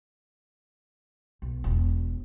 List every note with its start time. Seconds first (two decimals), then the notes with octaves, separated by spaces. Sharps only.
1.42 B1
1.64 E1